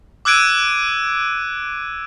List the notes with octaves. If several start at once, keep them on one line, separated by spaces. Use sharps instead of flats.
D6 E6 F#6 G#6 D7 D#7